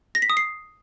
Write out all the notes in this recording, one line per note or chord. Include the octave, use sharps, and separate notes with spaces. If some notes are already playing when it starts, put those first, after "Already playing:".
A#6
B6
D#6
C7